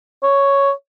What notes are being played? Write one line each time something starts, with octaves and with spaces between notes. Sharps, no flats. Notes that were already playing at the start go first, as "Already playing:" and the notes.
C#5